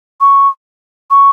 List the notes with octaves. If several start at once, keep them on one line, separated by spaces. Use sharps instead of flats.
C#6
C#6